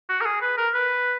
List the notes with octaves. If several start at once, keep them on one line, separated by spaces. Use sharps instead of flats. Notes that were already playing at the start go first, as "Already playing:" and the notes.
F#4
A#4
G#4
B4
A#4
B4